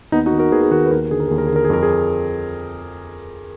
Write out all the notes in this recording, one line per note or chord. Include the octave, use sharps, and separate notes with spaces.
D#2 B3 D#4
D#4 F#4
D#3
F#4 A#4
D#2 G#4 B4
G#4
D#3 F#4 A#4
B4
D#2 F#4 A#4
D3 G#4
A#4
D#2 G#4
A#4
D3 G#4
A#4
G#4
F2 A#4
G#4